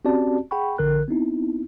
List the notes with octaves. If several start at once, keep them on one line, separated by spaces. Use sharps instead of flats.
C4 C#4 F#4 G4 D5 A5
G#4 F#5 G5 B5 C#6
A#1 D3 A#4 F#6
B3 C4 D#4 E4